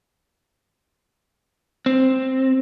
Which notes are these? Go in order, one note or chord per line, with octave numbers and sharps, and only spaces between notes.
C4